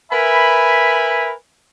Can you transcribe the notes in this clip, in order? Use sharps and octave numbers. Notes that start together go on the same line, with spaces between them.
A#4 B4 E5 G#5 B5